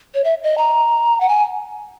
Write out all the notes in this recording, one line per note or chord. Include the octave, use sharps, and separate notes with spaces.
C#5
E5
D#5
A#5
F#5
G#5